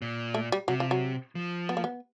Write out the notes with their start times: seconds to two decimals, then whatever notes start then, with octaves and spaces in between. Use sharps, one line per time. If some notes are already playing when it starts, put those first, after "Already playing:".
0.02 A#2
0.34 A3
0.52 G3
0.68 C3 F#3
0.80 F3
0.91 F#3
1.35 F3
1.69 B3
1.77 A#3
1.84 B3